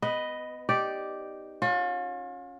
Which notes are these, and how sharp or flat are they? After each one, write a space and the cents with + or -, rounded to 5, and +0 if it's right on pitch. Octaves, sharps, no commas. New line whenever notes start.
B3 +30 B4 +0 D#5 +0
D#4 +0 G4 -5 D5 +0
C#4 +0 F4 +40